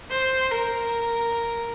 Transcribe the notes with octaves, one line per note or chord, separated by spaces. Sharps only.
C5
A#4